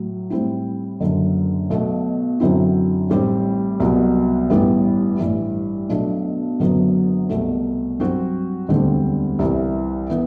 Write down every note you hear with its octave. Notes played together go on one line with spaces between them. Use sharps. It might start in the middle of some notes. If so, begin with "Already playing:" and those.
Already playing: A2 F#3
A2 G3 C4 E4
F#1 F#2 D3
B1 B2 A3
F#2 D3 F#3 C4 E4
A1 A2 G3 C4
C2 B2 F#3
A1 G2 E3 G3 B3
A1 G2 E3
B1 B2 A3 D4
F#1 F#2 D3 F#3 B3
C2 B2 A3
G2 F#3 C4 F#4
E1 D2 D3 G3 C4
C2 C3 E3
E3 B3